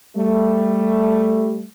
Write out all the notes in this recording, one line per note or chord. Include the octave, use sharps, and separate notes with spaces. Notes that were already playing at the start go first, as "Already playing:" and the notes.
G3 A3